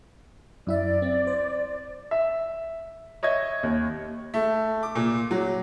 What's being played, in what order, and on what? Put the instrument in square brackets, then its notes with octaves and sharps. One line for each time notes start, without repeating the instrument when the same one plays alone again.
[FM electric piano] F#2 E4 E5 [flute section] D5
[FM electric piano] C4
C5
[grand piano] E5
C#5 D#5 E5 G#6
D#2
[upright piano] A3
D6
A#2
F#3